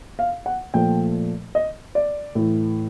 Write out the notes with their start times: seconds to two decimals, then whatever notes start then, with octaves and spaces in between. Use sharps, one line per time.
0.19 F5
0.46 F#5
0.74 A#2 F3 A3 G5
1.55 D#5
1.95 D5
2.35 A2 E3 A3